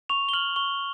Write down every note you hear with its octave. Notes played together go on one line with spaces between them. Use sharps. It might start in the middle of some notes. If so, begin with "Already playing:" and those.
C#6 F7
G7
F6 F#7
C#6 G7